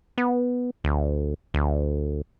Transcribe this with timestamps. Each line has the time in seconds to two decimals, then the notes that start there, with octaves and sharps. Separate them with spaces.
0.18 B3
0.84 D2
1.54 D2